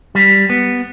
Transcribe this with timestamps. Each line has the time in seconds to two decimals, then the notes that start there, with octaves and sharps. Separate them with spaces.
0.15 G3
0.50 B3